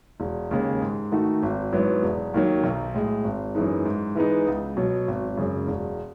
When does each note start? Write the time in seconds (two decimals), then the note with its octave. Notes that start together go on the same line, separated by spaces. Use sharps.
0.20 E1
0.51 D#2 C#3 G#3
0.82 G#2
1.12 D#3 A3 D#4 F#4
1.43 G#1
1.72 G#2 F#3 B3 E4
2.03 E1
2.34 D#2 D#3 F#3
2.64 B1
2.94 A2 G#3
3.24 G#1
3.55 F#2 E3 G#3 D#4
3.85 G#2
4.15 E3 G#3 B3 D#4
4.47 C#2
4.77 B2 F#3
5.08 G#1
5.37 F#2 C#3 G#3
5.67 E1